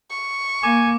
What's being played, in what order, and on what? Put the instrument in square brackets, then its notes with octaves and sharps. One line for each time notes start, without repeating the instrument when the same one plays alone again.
[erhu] C#6
[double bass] A#3 [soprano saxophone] G#5 [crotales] D6